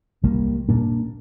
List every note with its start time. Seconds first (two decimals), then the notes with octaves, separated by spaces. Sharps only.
0.23 C2 G3 A#3
0.69 A#2 A#3 D4